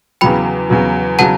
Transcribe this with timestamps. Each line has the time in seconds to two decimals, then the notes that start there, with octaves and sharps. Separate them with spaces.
0.21 E2 C#3 F#3 G5 B5
0.70 E2 C#3 F#3
1.19 C#3 F#3 F#5 A5